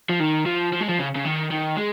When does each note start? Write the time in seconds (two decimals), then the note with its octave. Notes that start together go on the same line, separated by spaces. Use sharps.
0.09 F3
0.20 D#3
0.46 F3
0.73 F3
0.81 G#3
0.89 F3
0.99 C#3
1.15 C#3
1.25 D#3
1.51 D#3
1.77 G#3